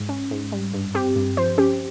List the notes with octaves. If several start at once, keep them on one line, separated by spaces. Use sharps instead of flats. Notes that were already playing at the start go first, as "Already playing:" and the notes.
Already playing: G#2
C#4
G#2
G3
G2
C4 G4
G2
F3 C5
C#4 G4